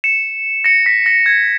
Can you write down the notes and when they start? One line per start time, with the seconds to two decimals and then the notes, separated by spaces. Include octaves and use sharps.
0.04 C#7 E7
0.64 A#6 C#7
0.86 B6
1.06 A#6
1.26 G#6